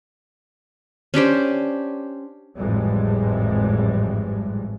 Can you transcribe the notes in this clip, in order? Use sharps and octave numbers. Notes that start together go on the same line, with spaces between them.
C#4 D4 G4 C5
G#1 F2 A2 E3 G3 G#3